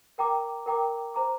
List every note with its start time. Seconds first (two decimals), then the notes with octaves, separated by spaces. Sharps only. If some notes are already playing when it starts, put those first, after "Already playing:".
0.18 A#4 G5 A#5 D6
0.66 A#4 G5 A#5 D6
1.14 C5 A#5 D6